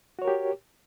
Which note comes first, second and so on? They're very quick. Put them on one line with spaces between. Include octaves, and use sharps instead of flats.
F#4 C#5 A#4 G4